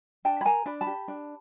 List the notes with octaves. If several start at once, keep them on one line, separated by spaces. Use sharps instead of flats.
D4 G5 A5
B5
A#4 G#5 A#5
D4 B5
A5 B5
G4
D4